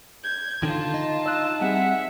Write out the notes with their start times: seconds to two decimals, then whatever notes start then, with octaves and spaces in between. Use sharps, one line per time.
0.23 G6 G#6
0.63 D3 D#3 F4 A5
0.94 D#4
1.26 D#5 E6 F#6
1.61 G3 C4 G#4 E5 F#5